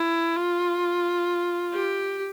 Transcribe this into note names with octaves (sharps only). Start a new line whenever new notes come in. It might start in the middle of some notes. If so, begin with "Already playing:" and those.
Already playing: E4
F4
G4